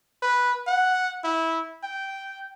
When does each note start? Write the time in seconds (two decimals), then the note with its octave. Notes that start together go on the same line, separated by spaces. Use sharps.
0.23 B4
0.67 F#5
1.24 E4
1.84 G5